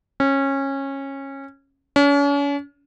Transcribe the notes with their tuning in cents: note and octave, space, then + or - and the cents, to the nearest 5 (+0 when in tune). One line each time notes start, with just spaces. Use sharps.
C#4 -20
C#4 +40